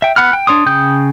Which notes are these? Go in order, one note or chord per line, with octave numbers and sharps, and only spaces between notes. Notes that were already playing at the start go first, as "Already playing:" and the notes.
E5 G5
B3 F#5 B5 F6
G5
D4 C#5 C6 D#6
C#3 G5 D#6 G6